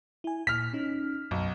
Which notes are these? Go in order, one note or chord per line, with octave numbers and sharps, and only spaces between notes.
E4 G#5
A#2 F6 B6
C#4 D#4
B1 F#2